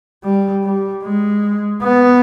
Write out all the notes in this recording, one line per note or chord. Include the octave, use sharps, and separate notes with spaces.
G3
G3
G#3
B3